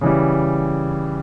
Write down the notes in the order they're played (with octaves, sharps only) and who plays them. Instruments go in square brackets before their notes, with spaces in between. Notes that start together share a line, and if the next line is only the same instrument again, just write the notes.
[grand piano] C#3 E3 G3